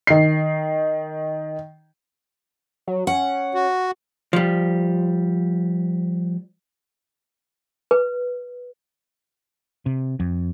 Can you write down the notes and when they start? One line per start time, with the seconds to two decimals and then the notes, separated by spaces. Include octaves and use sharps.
0.07 D#3 C7
2.88 F#3
3.07 C#4 F#5
3.54 F#4
4.33 F3 G3
7.91 B4
9.86 C3
10.20 F2